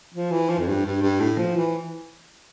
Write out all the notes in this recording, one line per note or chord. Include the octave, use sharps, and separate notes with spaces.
F3
E3
F3
F2
G2
G2
G2
A2
F3
E3